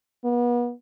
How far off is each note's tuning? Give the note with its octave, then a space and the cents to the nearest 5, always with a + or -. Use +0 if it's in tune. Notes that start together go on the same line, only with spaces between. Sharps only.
B3 -35